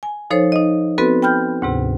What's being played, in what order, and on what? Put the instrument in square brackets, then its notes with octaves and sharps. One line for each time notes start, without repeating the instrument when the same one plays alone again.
[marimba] G#5
F3 D#4 A4 C5 C#5
D#4 D#5
B3 C4 F#4 A4 B4
G5 B5 F6 G6
D2 G#2 C3